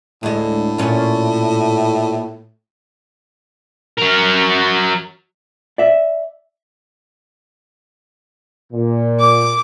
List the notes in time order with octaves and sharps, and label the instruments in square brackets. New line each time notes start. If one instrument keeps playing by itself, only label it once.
[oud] D2 G#3 [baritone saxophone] A2
[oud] A#2 C#4
[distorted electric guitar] F#3 A#4
[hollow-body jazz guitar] D5 E5
[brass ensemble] A#2
[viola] D6